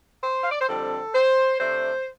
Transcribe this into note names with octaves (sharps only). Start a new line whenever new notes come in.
C5
F5
D5
C5
F2 D3 G3 C4 A4
C5
C3 A3 D4 C5